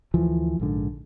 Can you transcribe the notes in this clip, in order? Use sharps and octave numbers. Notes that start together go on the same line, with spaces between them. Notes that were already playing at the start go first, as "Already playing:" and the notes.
D2 E3 F3
A#1 G#2 D3